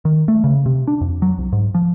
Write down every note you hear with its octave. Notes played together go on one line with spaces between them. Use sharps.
D#3
A3
C#3
C3
D4
F2
F#3
C2
G#2
F3